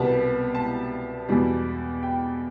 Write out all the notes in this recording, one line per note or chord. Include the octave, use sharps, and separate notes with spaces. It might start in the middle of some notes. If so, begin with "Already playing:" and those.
Already playing: C2 B2 G3 B3 A5
A5
E2 B2 G3
G5